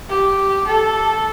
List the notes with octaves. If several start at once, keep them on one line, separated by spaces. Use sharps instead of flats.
G4
A4